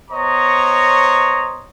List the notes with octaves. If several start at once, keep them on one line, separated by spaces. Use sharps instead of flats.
B3 C5 C#5 D#5 A#5 C#6